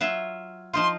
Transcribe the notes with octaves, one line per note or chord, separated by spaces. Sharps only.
F#3 F4 E5
F3 D#4 F4 C6